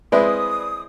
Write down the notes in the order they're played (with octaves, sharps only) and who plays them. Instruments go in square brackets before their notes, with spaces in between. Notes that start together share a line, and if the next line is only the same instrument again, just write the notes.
[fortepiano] G#3 C4 E4 [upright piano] B4 D5 [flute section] D#6